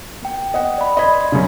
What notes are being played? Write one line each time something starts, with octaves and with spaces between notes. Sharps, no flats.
A#3 G5
D#5 F#5
D5 B5
D#5 B5 C6 G#6
F#2 C#3 D4